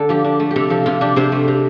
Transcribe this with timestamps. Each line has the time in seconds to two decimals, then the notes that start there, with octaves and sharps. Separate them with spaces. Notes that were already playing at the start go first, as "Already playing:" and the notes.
Already playing: D3 A4
0.09 F3 G4
0.24 D4
0.40 A3
0.51 G4
0.56 C3 A4
0.70 F3 A4
0.86 C3 F4
1.01 D4 G4
1.16 C3 C5
1.32 A3
1.48 C3